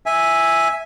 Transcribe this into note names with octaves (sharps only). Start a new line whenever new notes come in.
E5 G#5